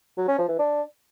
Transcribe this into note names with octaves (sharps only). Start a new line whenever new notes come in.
F#3
C#4
F3
E3
D4